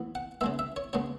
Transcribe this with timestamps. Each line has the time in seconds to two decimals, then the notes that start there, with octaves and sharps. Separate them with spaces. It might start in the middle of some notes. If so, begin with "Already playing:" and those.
Already playing: A2 E3 B3
0.15 F#5
0.41 C#3 G#3 B3 E5
0.59 E5
0.76 C#5
0.93 C#3 G#3 B3 C#5